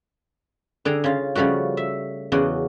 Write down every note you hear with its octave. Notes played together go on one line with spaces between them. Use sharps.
D3 G#4 G5 A#5
C#3 F4
C#3 F3 G3 A3 F#4
E5
E2 C#3 F#4 D5 D#5